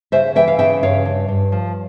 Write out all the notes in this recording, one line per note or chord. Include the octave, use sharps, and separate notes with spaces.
C#3 C5 E5
E3 E5 G5
F5
C#3 E5 G5
G2 C#5 F5
G2
G2
F3